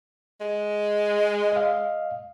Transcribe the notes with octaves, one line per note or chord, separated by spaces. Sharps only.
G#3
D#5 F5